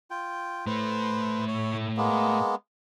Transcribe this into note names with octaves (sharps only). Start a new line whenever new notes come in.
F4 G5
A2 A3 B4 C5
C#5
G#3 A#3 B3